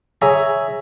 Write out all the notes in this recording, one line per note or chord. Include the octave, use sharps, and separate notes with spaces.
G#4 C#5 E5 G#5 A#5